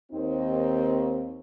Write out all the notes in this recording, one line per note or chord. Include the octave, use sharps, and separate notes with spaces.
D#2 C4 D#4